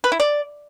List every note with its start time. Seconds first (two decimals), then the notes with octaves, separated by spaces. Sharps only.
0.04 B4
0.12 E4
0.20 D5